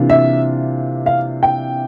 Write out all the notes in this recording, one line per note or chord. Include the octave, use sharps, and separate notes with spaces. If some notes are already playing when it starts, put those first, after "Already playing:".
Already playing: C3 E3 A#3 D4 F4
E5
F5
G5